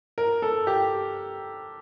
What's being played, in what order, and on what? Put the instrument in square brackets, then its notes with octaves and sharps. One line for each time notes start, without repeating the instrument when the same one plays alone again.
[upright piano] A#4
A4
G4